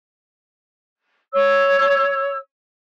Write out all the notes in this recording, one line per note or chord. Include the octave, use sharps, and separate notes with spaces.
C#5 E6